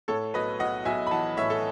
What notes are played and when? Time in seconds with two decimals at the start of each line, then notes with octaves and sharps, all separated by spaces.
0.08 A2 A4 C#5
0.34 B1 B4 D#5
0.60 B1 D#5 F#5
0.85 B1 E5 G#5
1.07 B5
1.11 E3 F#5 A5
1.37 A2 C#5 E5
1.50 A4 C#5